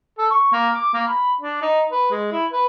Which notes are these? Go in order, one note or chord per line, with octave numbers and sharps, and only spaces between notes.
A4
C#6
A#3
D6
A#3
B5
D4
D#4
B4
G#3
E4
B4